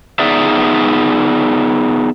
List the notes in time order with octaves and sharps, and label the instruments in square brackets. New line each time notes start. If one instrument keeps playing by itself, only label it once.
[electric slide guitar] B3 D#4 G#4 D5 E5